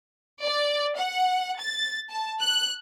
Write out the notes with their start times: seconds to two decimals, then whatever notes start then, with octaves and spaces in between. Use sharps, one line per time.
0.42 D5
0.97 F#5
1.60 A6
2.10 A5
2.41 F#6